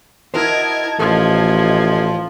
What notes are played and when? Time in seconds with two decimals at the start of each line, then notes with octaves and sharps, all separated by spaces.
0.34 E4 F#4 A#4 C5 D#5 A5 G#6
0.99 A1 F3 A4